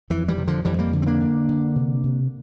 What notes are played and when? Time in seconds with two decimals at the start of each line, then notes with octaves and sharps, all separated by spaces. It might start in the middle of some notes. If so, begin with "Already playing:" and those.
0.10 F2 E3
0.28 E3 G3
0.38 C3
0.48 D3 F3
0.65 F2 E3 G3
0.79 G3 A#3
0.93 D3
1.02 C4
1.07 A#3 D4
1.20 D3
1.49 D3
1.76 C3
2.04 C3